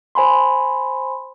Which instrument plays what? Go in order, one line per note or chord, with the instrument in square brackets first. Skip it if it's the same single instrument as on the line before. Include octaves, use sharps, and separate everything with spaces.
[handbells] C5 G#5 B5 C6